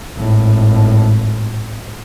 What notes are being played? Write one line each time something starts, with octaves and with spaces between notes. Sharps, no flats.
G#1 A2